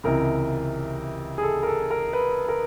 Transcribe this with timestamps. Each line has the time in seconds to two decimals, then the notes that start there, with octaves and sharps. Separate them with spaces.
0.04 C#2 C3 E3 A#4
1.38 G#4
1.43 A4
1.63 A#4
1.67 A4
1.91 A#4
2.13 B4
2.49 A#4